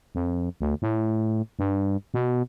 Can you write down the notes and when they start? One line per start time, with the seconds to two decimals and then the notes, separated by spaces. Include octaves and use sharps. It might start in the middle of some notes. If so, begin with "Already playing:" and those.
0.15 F2
0.61 D2
0.82 A2
1.59 G2
2.14 B2